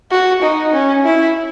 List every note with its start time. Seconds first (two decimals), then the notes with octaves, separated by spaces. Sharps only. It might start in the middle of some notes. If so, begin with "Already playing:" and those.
0.10 F#4
0.42 D#4
0.73 C#4
1.04 E4